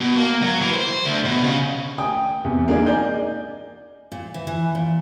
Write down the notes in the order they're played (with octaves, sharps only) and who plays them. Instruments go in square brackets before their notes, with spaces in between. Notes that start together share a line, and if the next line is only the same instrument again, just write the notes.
[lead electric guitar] B2
A#3
F#3
E3
C5
D2
B2
C#3
[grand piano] G5 G#5 D#6
E2 C3
G#3 A#3 D4 D#4 G#4 D5
D5 D#5 G#5 G6
[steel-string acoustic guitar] A#2
E3
E3
A#2